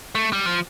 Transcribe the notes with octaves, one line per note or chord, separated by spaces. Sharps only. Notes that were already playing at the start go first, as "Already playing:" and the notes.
A3
G3
F3